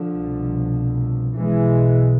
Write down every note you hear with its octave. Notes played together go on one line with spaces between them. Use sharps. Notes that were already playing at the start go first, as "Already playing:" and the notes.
Already playing: D3 F3
C2 B2
B1 B2 E3 G#3